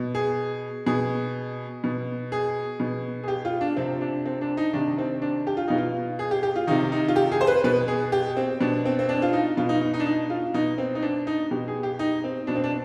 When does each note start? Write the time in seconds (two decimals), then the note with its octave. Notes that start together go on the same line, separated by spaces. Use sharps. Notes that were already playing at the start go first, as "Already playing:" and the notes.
Already playing: B2
0.15 G#4
0.86 B2 G#4
1.84 B2
2.32 G#4
2.80 B2
3.23 G#4
3.28 G4
3.45 F4
3.61 D4
3.77 C3 F3 C4
4.01 D4
4.25 C4
4.41 D4
4.57 D#4
4.73 C3 D#3 D4
4.98 C4
5.22 D4
5.47 G4
5.57 F4
5.68 B2 D#4
5.78 F4
6.19 G#4
6.31 G4
6.43 G4
6.56 F4
6.67 C3 D#3 D#4
6.92 D#4
7.08 F4
7.16 G4
7.32 G#4
7.41 C5
7.47 B4
7.64 B2 B4
7.88 G#4
8.12 G4
8.37 C4
8.61 B2 D4
8.85 C4
8.99 C4
9.09 D4
9.22 F4
9.33 D#4
9.57 B2 F4
9.69 D#4
9.81 D#4
9.94 D#4
10.00 D4
10.06 D#4
10.30 F4
10.54 B2 D#4
10.78 C4
10.95 D#4
11.02 D4
11.27 D#4
11.51 B2 G4
11.68 G#4
11.83 G4
11.99 D#4
12.24 C4
12.47 B2 D4
12.55 C4
12.64 D4